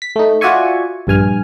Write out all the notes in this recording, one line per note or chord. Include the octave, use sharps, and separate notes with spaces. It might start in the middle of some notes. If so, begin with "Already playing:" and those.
B6
A3 D#4
F4 F#4 D5 E5 G#5 C#6
A#1 G2 G#5 F6